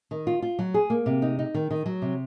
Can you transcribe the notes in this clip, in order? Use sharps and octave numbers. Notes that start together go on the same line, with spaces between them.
D#3
F4
F4
F#3
G#4
A#3
C3
D#4
D#4
D#3
D#3
F#3
C3